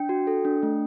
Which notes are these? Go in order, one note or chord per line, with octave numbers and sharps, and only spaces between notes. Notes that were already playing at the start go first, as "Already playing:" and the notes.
Already playing: D4 G5
F#4
A4
D4
A3